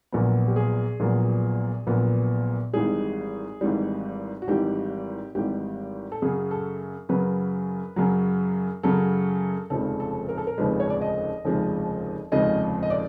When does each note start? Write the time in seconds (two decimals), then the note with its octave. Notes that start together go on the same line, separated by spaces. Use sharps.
0.12 A#1 A#2 F#3 B3
0.48 G4
0.56 G#4
1.00 A#1 A#2 F#3 B3
1.87 A#1 A#2 F#3 B3
2.73 G#1 G#2 E3 G3 G#4
3.61 G#1 G#2 E3 G3
4.42 F#4
4.48 G#1 G#2 E3 G3 G4
5.35 G#1 G#2 E3 G3 G4
6.12 A4
6.22 F#2 C#3 F#3 G#4
6.51 A4
7.09 F#2 C#3 F#3 B4
7.96 F#2 C#3 F#3
8.83 F#2 C#3 F#3 A4
9.70 F1 D#2 C#3 F3 G#3 A4
10.00 A4
10.29 A#4
10.38 A4
10.47 A#4
10.58 F1 D#2 C#3 F3 G#3 B4
10.80 C#5
10.90 D5
11.01 D#5
11.45 F1 D#2 C#3 F3 G#3
12.32 F1 D#2 C#3 F3 G#3 D#5
12.83 D#5
12.90 D5